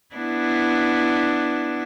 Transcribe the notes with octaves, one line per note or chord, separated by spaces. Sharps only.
B3 D4 E4